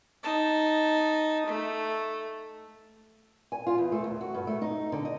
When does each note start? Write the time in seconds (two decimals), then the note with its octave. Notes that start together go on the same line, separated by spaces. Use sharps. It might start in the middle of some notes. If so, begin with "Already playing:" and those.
0.23 D#4 A5
1.46 A3
3.52 G#5
3.67 F4
3.78 E2
3.92 A3
4.04 D#2
4.21 F#4
4.34 G2
4.47 A3
4.62 D#4
4.92 D3
5.05 D#5